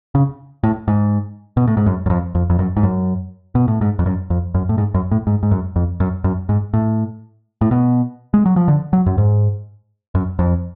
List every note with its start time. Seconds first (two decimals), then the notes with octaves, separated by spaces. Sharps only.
0.15 C#3
0.64 A2
0.88 G#2
1.57 B2
1.67 A2
1.77 G#2
1.86 F#2
2.06 F#2
2.10 F2
2.35 F2
2.50 F2
2.59 F#2
2.77 G#2
2.83 F#2
3.55 B2
3.68 A2
3.81 G#2
3.99 F2
4.06 F#2
4.30 F2
4.54 F#2
4.69 A2
4.78 G#2
4.94 F#2
5.11 A2
5.27 G#2
5.43 G#2
5.51 F#2
5.76 F2
6.00 F#2
6.24 F#2
6.49 G#2
6.74 A2
7.61 A2
7.71 B2
8.34 G#3
8.46 F#3
8.56 F3
8.68 D3
8.93 F#3
9.06 F#2
9.18 G#2
10.15 F#2
10.39 F2